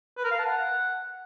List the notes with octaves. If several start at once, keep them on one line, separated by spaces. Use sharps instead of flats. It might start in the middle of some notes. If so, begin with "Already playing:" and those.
B4
A#4
F5
A5
F#5